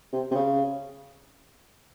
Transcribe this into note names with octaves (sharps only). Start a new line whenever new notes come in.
C3
C3
C#3